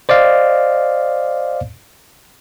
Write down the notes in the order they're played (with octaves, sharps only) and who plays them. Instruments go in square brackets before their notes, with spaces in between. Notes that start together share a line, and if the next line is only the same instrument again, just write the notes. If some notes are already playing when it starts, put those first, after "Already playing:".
[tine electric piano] C5 D5 D#5 F5